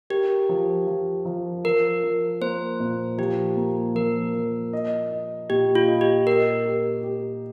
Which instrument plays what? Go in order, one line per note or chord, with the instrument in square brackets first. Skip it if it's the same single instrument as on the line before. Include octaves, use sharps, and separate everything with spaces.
[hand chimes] G4 [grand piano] A#4
[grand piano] F3
F3
F3
[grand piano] F3 [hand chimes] A#4
[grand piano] F3
[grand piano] A#3 [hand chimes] C5
[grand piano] A#2
[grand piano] F3 [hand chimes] G4
[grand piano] A#3
[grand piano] F3 [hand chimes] A#4
[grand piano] F3
D#5
D#5
[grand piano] A#2 [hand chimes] G4
[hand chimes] F4
[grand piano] D#5
[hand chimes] G4
[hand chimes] A#4 [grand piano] D#5
[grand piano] G4
G4